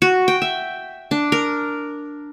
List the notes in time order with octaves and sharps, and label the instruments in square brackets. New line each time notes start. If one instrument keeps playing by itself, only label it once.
[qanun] F#4
G5
E5
D4
A#4